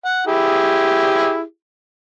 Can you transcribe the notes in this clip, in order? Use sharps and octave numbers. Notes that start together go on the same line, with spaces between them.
F#5
E4 G4 G#4